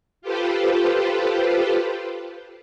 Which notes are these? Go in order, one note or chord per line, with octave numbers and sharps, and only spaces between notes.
F4 G4 A4 B4 C5